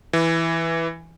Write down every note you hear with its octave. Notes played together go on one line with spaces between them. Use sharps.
E3